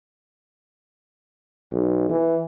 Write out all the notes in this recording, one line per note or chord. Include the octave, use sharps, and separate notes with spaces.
B1
E3